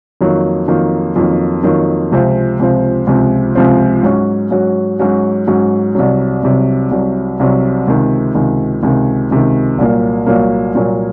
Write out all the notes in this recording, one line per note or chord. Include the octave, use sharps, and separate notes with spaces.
F2 D#3 F#3 A#3
F2 D#3 F#3 A#3
F2 D#3 F#3 A#3
F2 D#3 F#3 A#3
C#2 C3 F3 C4
C#2 C3 F3 C4
C#2 C3 F3 C4
C#2 C3 F3 C4
G#2 F#3 C#4 F#4
G#2 F#3 C#4 F#4
G#2 F#3 C#4 F#4
G#2 F#3 C#4 F#4
C2 C3 F#3
C2 C3 F#3
C2 C3 F#3
C2 C3 F#3
C#2 C3 D#3
C#2 C3 D#3
C#2 C3 D#3
C#2 C3 D#3
C2 A#2 F#3 A#3
C2 A#2 F#3 A#3
C2 A#2 F#3 A#3